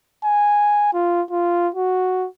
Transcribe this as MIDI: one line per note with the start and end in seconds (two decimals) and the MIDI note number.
0.24 0.90 80
0.93 1.22 65
1.30 1.69 65
1.75 2.27 66